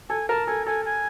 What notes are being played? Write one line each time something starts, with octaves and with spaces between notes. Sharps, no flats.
A4 G#5
A#4 A5
A4 G#5
A4 G#5
G#5